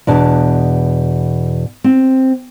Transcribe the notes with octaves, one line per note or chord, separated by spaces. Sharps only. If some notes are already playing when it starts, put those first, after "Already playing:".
E2 B2 D4 A5
C4